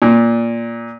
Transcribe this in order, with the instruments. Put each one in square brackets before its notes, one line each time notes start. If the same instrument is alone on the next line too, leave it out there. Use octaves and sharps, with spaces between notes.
[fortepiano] A#2